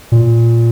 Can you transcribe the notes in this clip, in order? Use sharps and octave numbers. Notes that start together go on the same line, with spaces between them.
A#2